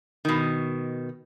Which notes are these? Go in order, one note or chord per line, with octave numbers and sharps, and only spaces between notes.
B2 D#3